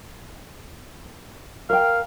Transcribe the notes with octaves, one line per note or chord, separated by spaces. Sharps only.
A#4 F5 G5